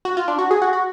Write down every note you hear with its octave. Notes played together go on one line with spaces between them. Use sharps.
F#4
F4
D4
F#4
G#4
F#4
F#4